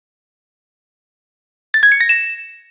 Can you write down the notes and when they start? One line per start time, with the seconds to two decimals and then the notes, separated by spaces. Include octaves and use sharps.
1.74 A6
1.83 G#6
1.92 C#7
2.01 A#6
2.09 E7